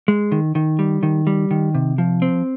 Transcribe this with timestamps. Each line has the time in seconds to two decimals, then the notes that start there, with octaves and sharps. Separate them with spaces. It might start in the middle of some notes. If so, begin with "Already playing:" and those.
0.08 G#3
0.32 D#3
0.55 D#3
0.79 G3
1.03 D#3
1.27 G3
1.51 D#3
1.75 C3
1.98 F3
2.22 C4